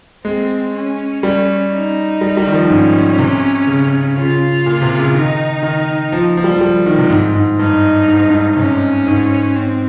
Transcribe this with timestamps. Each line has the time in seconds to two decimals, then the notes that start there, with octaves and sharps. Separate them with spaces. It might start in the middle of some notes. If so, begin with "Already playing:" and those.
0.25 G#3 C4
0.74 C#4
1.23 G3
1.72 D#4
2.21 G3
2.37 G3
2.47 D#3
2.53 F3
2.70 G#2 C#4
3.19 C3
3.67 C#3
4.17 C#3 F4
4.66 A#2
4.81 C3
4.98 C#3
5.15 D#3 D#4
5.63 D#3
6.12 F3
6.37 F3
6.44 G3
6.51 F3
6.61 G3
6.86 D#3
6.99 C3
7.10 G#2
7.35 G#2
7.59 G2 D#4
8.08 G#2
8.20 G2
8.30 G#2
8.57 C3 C#4
9.07 G#2
9.55 C4